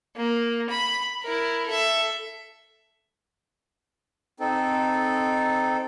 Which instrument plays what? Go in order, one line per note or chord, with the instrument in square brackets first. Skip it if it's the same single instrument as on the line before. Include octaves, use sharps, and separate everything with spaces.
[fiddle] A#3
B5
E4 A#4
A4 E5
[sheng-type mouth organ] C4 D#4 A4